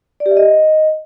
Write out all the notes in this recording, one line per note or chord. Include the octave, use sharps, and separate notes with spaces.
D5
G4
E5
D#5